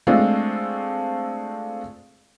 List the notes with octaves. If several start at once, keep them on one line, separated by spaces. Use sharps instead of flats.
G#3 A3 C4 D4 F4